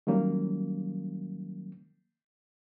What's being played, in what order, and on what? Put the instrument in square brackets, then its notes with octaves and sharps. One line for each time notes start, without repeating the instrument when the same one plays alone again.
[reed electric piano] D#3 F#3 G3 A#3 C#4